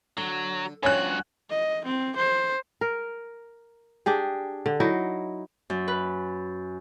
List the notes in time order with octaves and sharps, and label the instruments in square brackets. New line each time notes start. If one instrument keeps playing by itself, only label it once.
[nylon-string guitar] D3 [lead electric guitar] F#3
[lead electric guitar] G2 F#4 [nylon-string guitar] F3 C#4 C#5 [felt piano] G#5 F#6
[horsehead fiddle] D#5
C4
C5
[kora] A#4
D4 G4 G#4
D3
F#3 D#4 E4
[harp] F#2
B4